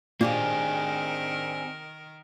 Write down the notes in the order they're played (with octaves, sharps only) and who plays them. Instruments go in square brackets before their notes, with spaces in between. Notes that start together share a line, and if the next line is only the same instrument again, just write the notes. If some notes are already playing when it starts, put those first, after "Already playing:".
[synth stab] A#2 [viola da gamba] D#3 A#4 [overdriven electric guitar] C4 G#4 [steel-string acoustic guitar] D4 G4 C5